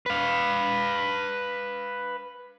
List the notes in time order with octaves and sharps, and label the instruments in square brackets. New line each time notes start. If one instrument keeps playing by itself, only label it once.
[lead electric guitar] B4 F5